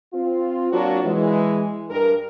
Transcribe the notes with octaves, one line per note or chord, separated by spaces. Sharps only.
C4 F4
F#3 A#3 D4 F4 F#4
E3 G#3
G2 A#4